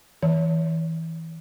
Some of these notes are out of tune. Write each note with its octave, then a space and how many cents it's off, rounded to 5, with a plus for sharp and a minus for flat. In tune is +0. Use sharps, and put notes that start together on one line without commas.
E3 -20 C#5 +30